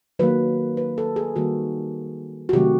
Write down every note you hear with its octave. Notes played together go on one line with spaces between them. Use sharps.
D#3 F#3 A#3 B4
B4
A4
G#4
D#3 G3 A#3 F#4
F#4
C3 D#3 F#3 A3 G4